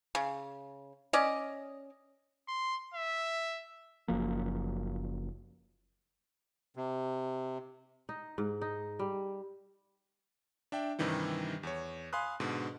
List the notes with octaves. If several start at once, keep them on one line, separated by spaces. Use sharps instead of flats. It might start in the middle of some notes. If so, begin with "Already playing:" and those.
C#3
C#4 D5 D#5
C6
E5
F#1 F#2 F3 A#3
C3
D#4
G#2
D#4
G3
D4 E5 G5
G2 C3 D#3 E3 G3
E2 C#5
F5 G#5 B5 C6 D#6 F#6
G#2 B2 D3